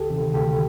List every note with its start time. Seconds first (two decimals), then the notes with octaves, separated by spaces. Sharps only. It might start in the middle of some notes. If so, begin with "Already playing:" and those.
Already playing: D2 G4 A4
0.10 C3 D#3
0.34 D2 G4 A4